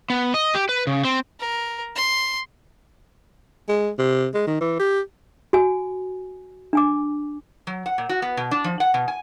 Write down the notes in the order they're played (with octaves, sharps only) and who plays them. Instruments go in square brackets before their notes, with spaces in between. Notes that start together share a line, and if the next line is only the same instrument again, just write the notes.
[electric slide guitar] B3
D#5
G4
B4
C#3
C4
[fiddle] A#4
C6
[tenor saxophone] G#3
C3
G#3
D#3
E3
G4
[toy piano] F#4 G#5
D4 G#5 D6
[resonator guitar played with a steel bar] F#3
F#5
A#2
F#4
B3
B2
D4
F3
F#5
B2
G#5